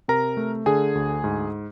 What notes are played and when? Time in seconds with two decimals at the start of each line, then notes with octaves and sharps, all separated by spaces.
0.08 C3 A#4 A#5
0.37 A3
0.66 D3 G#4 G#5
0.95 D2
1.24 G#2